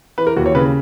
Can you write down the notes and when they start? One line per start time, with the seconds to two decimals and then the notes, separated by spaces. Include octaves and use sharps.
0.18 E3 B4
0.27 A#4
0.37 D#2 F#4
0.46 C#5
0.55 C#3 B4